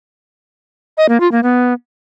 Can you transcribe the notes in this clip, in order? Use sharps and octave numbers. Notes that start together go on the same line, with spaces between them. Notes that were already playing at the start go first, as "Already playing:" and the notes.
D#5
A#3
F4
A#3
B3